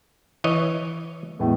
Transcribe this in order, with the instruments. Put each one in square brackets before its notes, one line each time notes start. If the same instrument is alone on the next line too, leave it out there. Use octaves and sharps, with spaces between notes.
[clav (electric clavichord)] E3 C#5 D#5
[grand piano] E2 A2 G#3